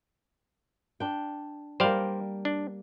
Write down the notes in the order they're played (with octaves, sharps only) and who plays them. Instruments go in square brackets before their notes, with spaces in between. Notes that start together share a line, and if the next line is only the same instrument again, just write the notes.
[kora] D4 G5
[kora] G3 A#3 [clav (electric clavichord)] C5 D5 F5
[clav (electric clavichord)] D4